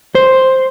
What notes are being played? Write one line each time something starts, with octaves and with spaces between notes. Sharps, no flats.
C5